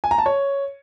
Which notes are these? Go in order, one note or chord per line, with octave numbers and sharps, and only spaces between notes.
G#5
A#5
A5
C#5